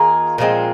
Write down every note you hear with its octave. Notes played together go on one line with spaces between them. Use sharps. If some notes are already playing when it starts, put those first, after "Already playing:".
Already playing: D#3 A#3 F4 G#4
A#2 F3 G#3 C4